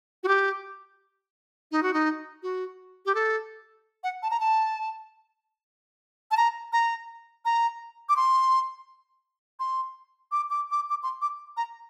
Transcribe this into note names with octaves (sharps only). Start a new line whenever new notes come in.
F#4
G4
D#4
F#4
D#4
F#4
G4
A4
F#5
A5
A#5
A5
A5
A#5
A#5
A#5
D6
C6
C6
D6
D6
D6
D6
C6
D6
A#5